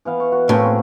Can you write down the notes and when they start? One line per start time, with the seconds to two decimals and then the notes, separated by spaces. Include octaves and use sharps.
0.05 E3 B3 F5
0.20 C#6
0.32 F#4
0.49 A2 A#3 C4 C#4
0.65 C4